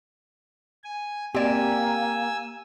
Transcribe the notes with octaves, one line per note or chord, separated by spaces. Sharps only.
G#5
A#3 C4 G4 D5 G#5 E6